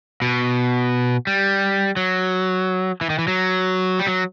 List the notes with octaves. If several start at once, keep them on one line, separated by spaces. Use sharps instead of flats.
B2
G3
F#3
E3
D#3
E3
F#3
G3
F#3